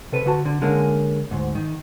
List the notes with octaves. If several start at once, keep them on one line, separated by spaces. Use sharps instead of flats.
C3 A4 B4
D3 F#4 A5
D3
D3 G#3 A#3 C#4
D2 G#2
D#3